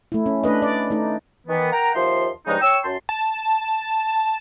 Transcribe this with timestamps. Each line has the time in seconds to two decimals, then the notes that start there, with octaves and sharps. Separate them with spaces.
0.12 A3 E4
0.26 C#4
0.44 A3 D4 B4 D#5
0.62 D5
0.90 A3 D#4
1.47 D#3 E3 B3
1.71 A#4 F#5 G5 A#5
1.93 D#2 F3 E5 C6
2.47 G2 C#3 F3 G#3 D#4
2.61 C#5 G5 C#6 E6
2.84 F#2 A5 C6
3.09 A5